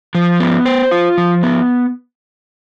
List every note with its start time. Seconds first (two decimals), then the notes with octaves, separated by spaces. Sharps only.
0.15 F3
0.40 B3
0.65 C5
0.91 F4
1.18 F3
1.43 B3